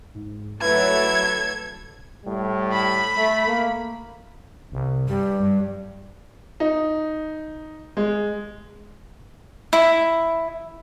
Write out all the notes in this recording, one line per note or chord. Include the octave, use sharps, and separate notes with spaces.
G#2
F#3 A3 E4 A4 B4 G#6
A2 G3
B5
A3
A#3
C2
G2 G3
G2
D#4
G#3
E4